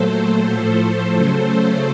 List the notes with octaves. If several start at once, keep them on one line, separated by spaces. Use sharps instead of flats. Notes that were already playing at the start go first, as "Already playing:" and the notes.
Already playing: A#2 F#3 A3 A4 C5
A4 C5
A2 F3 A3
C#3 F#3 A3 A4 C5
A4 C5